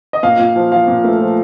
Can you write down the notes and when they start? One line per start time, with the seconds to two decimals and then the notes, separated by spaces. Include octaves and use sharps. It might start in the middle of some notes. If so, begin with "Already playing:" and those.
0.13 D#5
0.23 A#2 F5
0.39 A#2
0.56 F3
0.72 F3 F5
0.88 A#2
1.04 A3
1.21 F3